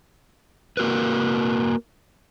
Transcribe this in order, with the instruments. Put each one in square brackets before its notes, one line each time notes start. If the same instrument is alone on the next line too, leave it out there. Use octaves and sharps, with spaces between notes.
[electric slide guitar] A#3 F#4 A#4 B4